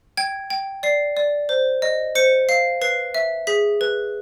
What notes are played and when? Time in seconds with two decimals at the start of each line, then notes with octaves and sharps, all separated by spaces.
0.17 G5 G#6
0.50 G5
0.83 D5 C7
1.17 D5
1.49 C5
1.82 D#5
2.15 C5 C#7
2.49 F5 C7
2.82 B4 C7
3.15 E5
3.47 G#4 B6
3.81 B4